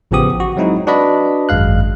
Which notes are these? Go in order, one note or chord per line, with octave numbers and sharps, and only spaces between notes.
A1 C#3 F3 B3 G4 D#6
F#4
F#3 G#3 C4 D#4 E4
D4 F#4 B4 D5 D#5 B5
G#1 F#2 G#3 F5 F#6